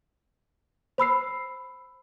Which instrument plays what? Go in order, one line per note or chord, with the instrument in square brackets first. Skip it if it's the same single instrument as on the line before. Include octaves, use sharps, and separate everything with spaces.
[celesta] C5 B5 E6 C7